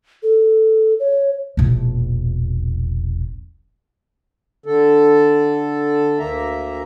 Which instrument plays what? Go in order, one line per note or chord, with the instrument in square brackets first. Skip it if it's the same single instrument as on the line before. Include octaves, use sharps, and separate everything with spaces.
[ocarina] A4
C#5
[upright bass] E1 A#1
[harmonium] D3 A4
D2 A#3 E5 A#5